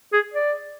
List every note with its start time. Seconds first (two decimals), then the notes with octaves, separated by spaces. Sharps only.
0.13 G#4
0.34 D5